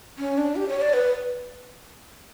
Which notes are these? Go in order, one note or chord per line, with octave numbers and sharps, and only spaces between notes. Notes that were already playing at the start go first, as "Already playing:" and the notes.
C#4
D4
G4
C#5
D5
B4